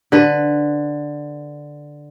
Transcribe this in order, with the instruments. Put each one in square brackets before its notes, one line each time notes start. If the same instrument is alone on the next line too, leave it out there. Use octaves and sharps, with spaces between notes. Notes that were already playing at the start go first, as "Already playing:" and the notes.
[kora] D3 B4